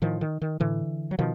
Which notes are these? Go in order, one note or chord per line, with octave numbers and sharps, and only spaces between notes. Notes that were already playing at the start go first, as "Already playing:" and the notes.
A2 D#3 F3
D#3
D#3
A2 D3 E3
F#3
B2 D#3 F3